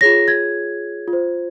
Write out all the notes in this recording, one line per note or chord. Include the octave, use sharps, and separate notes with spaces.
F4 G#4 C#5 A#6
G#6
F4
C5